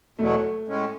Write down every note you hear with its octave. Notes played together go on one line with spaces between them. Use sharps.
E2 B2 F#3 A3
A2 G#3 C#4